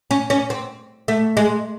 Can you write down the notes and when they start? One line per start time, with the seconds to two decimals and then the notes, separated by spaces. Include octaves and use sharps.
0.11 C#4
0.30 C#4
0.50 C4
1.08 A3
1.37 G#3